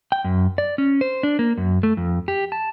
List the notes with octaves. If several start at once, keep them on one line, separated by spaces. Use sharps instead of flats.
G5
F#2
D5
C#4
C5
D4
A#3
F#2
A3
F2
G4
A5